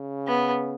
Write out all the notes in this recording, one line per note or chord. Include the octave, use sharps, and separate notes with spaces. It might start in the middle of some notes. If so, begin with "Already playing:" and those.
Already playing: C#3
B3